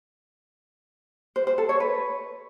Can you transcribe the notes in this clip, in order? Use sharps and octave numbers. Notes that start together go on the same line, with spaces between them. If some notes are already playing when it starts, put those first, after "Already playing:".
C5
C5
A4
C#5
B4